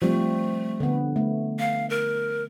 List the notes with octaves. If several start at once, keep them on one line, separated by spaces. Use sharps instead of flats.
F3 G3 A3 C4
D3 B3
A3
F5
A#4